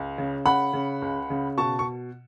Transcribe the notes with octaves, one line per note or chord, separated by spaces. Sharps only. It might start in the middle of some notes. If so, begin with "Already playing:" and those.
Already playing: C#2
C#3
C#3 F#5 B5
C#3
C#2
C#3
B2 A5 C#6
C#6